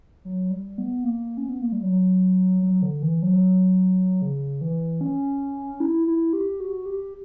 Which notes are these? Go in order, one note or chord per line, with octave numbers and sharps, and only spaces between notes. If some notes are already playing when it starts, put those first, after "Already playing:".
F#3
G3
B3
A#3
C#4
B3
A#3
G3
F#3
F#3
D3
E3
F#3
C#3
E3
C#4
E4
E4
G4
F#4
G4